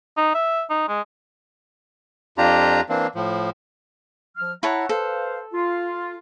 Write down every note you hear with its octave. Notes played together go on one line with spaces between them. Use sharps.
D#4
E5
D#4
G#3
F2 D4 F4 G4 A#5
E3 A#3 C4 D4
A2 F3
F3 F6
E4 C#5 E5 F#5 A5 A#5
A4 B4 C5 F5
F4